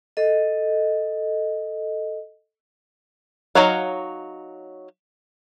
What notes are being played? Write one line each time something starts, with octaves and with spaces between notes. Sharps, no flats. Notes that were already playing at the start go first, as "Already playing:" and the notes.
A4 D#5
F#3 D#4 C#5 F5 F#5